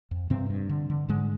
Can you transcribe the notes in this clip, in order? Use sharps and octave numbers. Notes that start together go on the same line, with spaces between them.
F2
G2 C3 C4
G2
D3
D3
G#2 D3 G#3